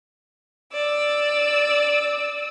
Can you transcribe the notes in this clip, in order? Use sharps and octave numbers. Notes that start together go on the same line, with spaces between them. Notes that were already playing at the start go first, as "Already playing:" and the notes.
D5 E6